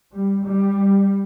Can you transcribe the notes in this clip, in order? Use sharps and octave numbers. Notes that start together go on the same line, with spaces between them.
G3
G3